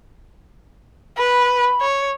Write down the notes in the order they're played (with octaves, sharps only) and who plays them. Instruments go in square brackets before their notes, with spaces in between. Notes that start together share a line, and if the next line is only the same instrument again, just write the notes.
[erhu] B4 [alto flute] B5
[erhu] C#5